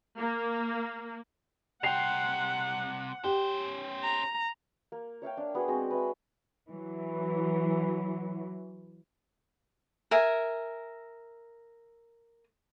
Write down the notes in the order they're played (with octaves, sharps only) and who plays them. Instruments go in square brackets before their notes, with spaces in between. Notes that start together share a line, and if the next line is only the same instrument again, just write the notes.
[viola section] A#3
[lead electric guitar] C2 C3 [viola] F#5 [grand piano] G5 C7 F7
[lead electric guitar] C#4 C5 [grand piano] G4
[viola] A#5
[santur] A#3
C#5 E5 F5 G5
D4
B3 F#4 G#4
G#3 C4 F#4
B4 E5
[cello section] E3 F#3
[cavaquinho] A#4 E5 G#5